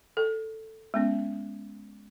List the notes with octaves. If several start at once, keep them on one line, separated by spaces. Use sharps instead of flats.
A4
G#3 B3 C#4